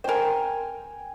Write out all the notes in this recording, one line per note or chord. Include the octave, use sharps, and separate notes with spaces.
A#4 C5 G5 G#5